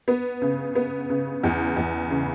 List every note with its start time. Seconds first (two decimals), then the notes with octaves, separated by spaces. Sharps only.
0.08 B3
0.42 C#3
0.75 B3
1.10 C#3
1.44 E2
1.77 E2
2.10 C#3